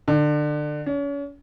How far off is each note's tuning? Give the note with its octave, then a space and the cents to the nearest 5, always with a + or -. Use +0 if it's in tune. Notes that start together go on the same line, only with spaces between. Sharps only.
D3 +25
C#4 +35